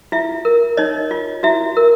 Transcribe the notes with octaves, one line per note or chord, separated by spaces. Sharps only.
E4 F4 E5
A#4
D#4 C#5 D#5
F4
E4 F#4 E5
A#4